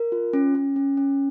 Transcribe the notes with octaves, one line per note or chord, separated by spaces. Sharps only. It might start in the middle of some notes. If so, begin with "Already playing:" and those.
Already playing: A#4
F4
C#4
C#4
C#4
C#4